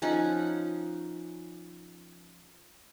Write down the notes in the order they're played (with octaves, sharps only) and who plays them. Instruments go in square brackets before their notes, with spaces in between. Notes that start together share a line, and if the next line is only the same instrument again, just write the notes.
[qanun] F3 C#4 D#4 F#5